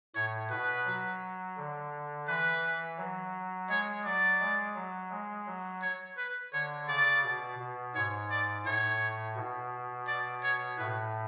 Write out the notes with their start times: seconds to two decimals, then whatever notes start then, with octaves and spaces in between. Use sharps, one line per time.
0.15 A2 C#5
0.50 B2 B4
0.85 F#3
1.57 D3
2.27 E3 B4
2.98 F#3
3.69 G#3 C#5
4.05 F#3 D5
4.40 G#3
4.75 F#3
5.11 G#3
5.47 F#3
5.82 C#5
6.18 B4
6.53 D3 C#5
6.88 C#3 D5
7.24 B2
7.59 B2
7.95 G#2 C#5
8.30 D5
8.65 A2 C#5
9.36 B2
10.07 D5
10.43 C#5
10.78 A2 B4